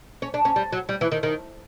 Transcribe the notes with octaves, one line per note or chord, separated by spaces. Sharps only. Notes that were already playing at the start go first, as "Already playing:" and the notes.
C#4
D4
C#4
G3
F#3
G3
E3
D#3
D#3